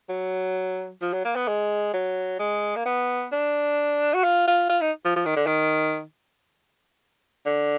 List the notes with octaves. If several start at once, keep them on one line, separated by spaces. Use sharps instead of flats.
F#3
F3
F#3
A#3
B3
G#3
F#3
G#3
A#3
B3
D4
F#4
F4
F4
F4
D#4
F3
F3
D#3
D3
D#3
D3